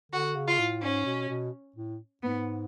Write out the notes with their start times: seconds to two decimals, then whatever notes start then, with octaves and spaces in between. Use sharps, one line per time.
0.12 D3 F#4
0.36 C#3
0.47 F4
0.59 A2
0.82 G#2 C#4
1.06 B2
1.29 B2
1.76 A2
2.22 G#2 B3